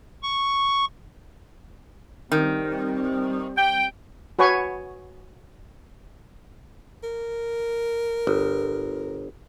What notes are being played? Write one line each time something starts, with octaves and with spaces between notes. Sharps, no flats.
C#6
D#3 G3 C4
G5
F#4 B4 C#5 G#5 C#6
A#4
G1